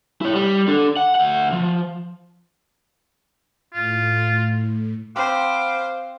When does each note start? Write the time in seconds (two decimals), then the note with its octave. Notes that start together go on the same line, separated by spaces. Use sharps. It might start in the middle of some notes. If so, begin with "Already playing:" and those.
0.21 E4 C#5
0.33 G3
0.68 D4 A4
0.97 F#5
1.15 D2 F#5
1.53 F3
3.74 A2 F4
5.16 C4 C5 F5 F#5 B5 D6